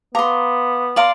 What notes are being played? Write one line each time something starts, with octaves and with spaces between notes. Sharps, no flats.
B3 F5 A#5 C6 D6
D5 F5 A#5 C6 D7 F#7